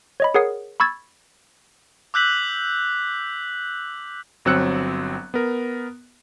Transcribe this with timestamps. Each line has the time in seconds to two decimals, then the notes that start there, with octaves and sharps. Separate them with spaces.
0.20 C#5 D#5 B5
0.34 G#4 A#4 C#5 F#5 D#6 C7
0.80 B5 C#6 E6 G#6 A6
2.14 D6 E6 F#6 G6 B6 F#7
4.45 G1 F#3 C4 E6 F#6 C#7
5.34 B3 A#4